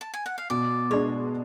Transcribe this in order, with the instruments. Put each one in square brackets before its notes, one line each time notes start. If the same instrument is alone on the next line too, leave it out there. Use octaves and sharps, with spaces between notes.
[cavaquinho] A5
G#5
F#5
F5
[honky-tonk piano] B2 [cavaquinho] D5
[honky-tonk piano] G#3 D4 [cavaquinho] C#5